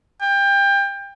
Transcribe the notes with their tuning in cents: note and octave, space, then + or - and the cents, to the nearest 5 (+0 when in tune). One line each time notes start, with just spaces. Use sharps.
G5 +25